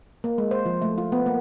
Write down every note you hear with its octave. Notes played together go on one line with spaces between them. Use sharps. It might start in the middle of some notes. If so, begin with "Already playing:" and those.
A#3
G#3
C5
F3
A3
F4
B3
A#3